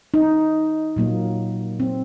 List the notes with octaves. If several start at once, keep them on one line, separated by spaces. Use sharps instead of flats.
D#4
A#2 F#3 A#3
C4